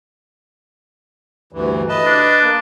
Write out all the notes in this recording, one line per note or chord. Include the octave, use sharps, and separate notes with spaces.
D2 G2 E3
B4 D#5 A5
D4
A#3